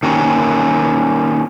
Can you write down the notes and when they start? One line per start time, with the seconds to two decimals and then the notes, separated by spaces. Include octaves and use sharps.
0.03 D#3 A#3 C#4